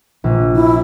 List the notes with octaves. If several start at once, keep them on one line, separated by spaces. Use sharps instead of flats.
A#1
E4